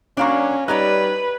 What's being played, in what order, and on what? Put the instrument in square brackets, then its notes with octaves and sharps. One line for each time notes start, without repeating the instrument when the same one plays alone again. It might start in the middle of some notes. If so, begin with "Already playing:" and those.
[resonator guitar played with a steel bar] F#3 A#3 D4 [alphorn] C#4 [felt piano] D5 F5 C#6
[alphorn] G3 [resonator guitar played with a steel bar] D#4 C#5 D5 [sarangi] B4 [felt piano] F#6